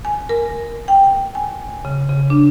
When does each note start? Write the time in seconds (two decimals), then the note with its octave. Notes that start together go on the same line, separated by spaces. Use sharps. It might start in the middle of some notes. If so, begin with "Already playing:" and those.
0.05 G#5
0.29 A#4
0.88 G5
1.35 G#5
1.85 C#3
2.09 C#3
2.30 D4